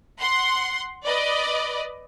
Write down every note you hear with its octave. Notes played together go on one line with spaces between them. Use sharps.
F#5 C6
B4 D5 D#5